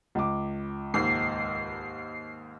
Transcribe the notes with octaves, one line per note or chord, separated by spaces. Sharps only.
C#2 D6
D#2 G#2 C7